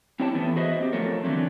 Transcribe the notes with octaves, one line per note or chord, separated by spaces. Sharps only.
C4 E4 G4 C#5 G5 A5
E3 A3 B3
F#4 G#4 B4 C5 D#5 E5
B3 C4 G4
F3 A3 F4 A4 A#4 C#5
D3 E3 F#3 A3 C4